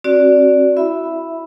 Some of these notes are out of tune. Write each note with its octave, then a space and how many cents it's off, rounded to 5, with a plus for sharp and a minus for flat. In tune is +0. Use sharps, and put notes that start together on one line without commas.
C4 +40 F#4 +0 D5 -10
E4 +0 E5 +0 B5 +0